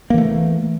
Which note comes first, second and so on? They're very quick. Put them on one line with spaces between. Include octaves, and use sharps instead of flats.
A#3 E3 A3